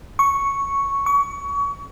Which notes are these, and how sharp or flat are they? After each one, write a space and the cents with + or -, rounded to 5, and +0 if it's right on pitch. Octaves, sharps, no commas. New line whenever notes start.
C#6 +0
C#6 +30